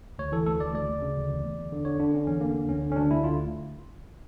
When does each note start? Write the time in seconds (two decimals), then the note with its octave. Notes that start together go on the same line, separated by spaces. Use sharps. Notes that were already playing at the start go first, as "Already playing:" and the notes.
0.19 D2 C#5
0.32 E3 A4
0.46 D2 A4
0.60 D2 D5
0.74 D2 D5
0.88 D2
1.02 C#3
1.17 D2
1.30 E2
1.44 E2
1.58 E2
1.72 D3
1.85 D3 C#5
1.99 D3 D4
2.14 D3 C#4
2.27 E2 C#4
2.41 D3 A#3
2.54 D3
2.69 D2 C#4
2.83 D3
2.92 C#4
2.96 D2 D4
3.10 D2 E4
3.24 D3 F4